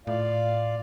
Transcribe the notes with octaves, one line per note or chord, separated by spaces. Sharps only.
A2 F4 D5 F5